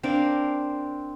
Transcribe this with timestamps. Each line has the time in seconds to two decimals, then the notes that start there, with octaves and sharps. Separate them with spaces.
0.03 C4 D4 A#4 F5